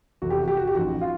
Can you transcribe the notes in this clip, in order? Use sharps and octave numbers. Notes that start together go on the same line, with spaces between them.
F1 E2 C3 F#4
G4
F#4
G4
F#4
G4
A1 G#2 F3 F#4
F4